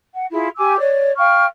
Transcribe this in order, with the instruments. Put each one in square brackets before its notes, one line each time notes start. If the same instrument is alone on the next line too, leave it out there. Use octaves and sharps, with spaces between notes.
[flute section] F#5
E4 F4 G#4
G4 G#5 D6 E6
C#5 D5
F5 G5 C#6 F6